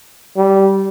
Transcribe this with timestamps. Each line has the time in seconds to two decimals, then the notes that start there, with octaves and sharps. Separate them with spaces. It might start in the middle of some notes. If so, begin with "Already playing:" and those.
0.36 G3